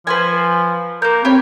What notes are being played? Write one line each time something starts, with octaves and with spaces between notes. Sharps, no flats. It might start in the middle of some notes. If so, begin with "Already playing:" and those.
F3 B4 C5 G#5
A#3 A#4 G6
C4 G4 B4 C#5